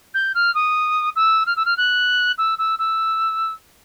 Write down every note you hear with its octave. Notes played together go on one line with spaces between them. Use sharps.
G6
F6
D#6
E6
F6
E6
F6
F#6
E6
E6
E6